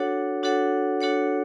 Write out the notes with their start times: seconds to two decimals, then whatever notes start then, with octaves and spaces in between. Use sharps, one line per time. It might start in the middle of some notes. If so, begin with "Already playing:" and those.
Already playing: D4 F#4 A4 C#5 F#5
0.43 D4 F#4 A4 C#5 F#5
1.01 D4 F#4 A4 C#5 F#5